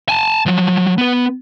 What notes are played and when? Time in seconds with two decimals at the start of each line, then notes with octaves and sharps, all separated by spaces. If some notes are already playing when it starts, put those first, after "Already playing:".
0.09 G#5 A5
0.46 F3 F#3
0.98 B3 B4